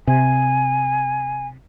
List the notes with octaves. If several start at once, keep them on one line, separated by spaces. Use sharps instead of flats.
C3 G#5